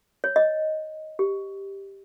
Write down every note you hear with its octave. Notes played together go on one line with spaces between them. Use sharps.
C#5
D#5
G4